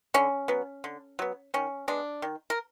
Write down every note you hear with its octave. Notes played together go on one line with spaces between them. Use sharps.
D3 C#4
F#3 B3
D3
F#3 B3
D#3 C#4
G#3 B3 D4
D#3
A#4